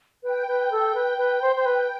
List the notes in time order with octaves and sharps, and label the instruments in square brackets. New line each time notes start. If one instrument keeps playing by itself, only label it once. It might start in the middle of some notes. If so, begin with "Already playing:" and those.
[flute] B4 [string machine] G5
[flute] B4
A4
B4
B4
C5
C5
B4